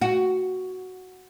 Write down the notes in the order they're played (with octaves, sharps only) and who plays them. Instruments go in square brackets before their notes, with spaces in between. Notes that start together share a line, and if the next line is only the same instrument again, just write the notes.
[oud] F#4